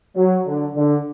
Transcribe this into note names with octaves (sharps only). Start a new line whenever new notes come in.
F#3
D3
D3